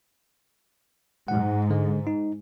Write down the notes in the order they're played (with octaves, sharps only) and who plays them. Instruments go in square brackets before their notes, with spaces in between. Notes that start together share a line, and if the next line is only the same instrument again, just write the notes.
[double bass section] G#2 [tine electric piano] F#5
[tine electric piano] D3 G#3
D#4